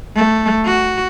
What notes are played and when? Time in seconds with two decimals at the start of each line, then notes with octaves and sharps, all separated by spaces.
0.16 A3
0.66 F#4